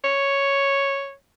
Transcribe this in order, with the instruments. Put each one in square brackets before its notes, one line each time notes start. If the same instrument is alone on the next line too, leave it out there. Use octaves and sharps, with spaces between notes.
[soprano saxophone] C#5